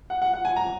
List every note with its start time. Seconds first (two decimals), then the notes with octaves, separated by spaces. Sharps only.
0.10 F#5
0.22 F#5
0.34 F#5
0.45 G#5
0.56 A#5